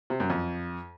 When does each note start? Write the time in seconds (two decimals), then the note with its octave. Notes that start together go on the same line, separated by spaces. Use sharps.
0.10 C3
0.20 F#2
0.30 F2